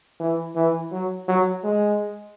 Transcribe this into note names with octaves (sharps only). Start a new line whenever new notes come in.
E3
E3
F#3
F#3
G#3